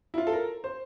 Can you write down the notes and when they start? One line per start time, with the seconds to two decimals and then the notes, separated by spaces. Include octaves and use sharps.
0.14 E4
0.18 F4
0.27 A4
0.33 A#4
0.64 C5